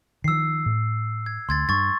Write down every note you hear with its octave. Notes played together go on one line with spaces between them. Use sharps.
D#3 F3 E6 C7
A2
G#6
D2 C6 G#6 A6
G2 C#6 A6